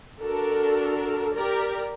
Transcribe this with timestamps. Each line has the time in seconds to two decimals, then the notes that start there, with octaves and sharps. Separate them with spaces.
0.22 D4 F#4 A4 A#4
1.34 G4 A#4 D5